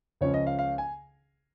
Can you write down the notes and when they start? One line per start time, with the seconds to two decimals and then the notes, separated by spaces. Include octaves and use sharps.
0.21 C#2 C#3 F3 C#4 C#5
0.34 D#5
0.47 F5
0.59 F5
0.78 G#5